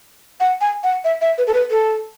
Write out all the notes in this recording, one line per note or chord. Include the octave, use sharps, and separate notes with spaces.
F#5
G#5
F#5
E5
E5
B4
A4
B4
A4